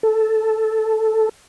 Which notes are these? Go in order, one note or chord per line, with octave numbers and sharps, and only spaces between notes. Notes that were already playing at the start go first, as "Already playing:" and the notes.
A4